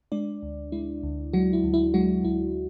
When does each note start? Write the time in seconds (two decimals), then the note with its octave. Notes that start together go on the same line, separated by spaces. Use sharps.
0.12 G#3 D4 D5
0.43 D2
0.72 G#3 E4
1.03 D2
1.33 F#3 G#3 F#4
1.53 E4
1.64 D2
1.74 E4
1.94 F#3 G#3 F#4
2.24 D2 E4